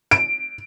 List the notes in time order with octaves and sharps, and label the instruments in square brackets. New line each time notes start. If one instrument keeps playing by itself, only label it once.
[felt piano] D7